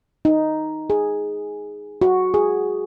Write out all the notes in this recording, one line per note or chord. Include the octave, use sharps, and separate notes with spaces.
D#4
G#4
F#4
G#4